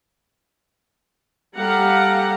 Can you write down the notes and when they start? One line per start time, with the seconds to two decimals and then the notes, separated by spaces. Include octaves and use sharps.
1.56 G3 G4 A4 F5 F#5 A#5